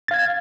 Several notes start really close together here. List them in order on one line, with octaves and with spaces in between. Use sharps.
A6 F5 G#6